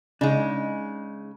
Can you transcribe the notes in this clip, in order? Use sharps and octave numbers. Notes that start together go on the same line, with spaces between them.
C#3 G#3 D4 D#4